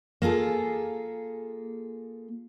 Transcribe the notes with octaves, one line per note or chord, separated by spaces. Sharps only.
A#3 F4 G#4 A4